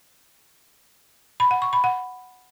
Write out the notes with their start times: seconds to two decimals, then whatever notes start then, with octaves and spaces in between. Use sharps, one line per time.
1.40 B5
1.51 F#5
1.62 C#6
1.73 B5
1.84 F#5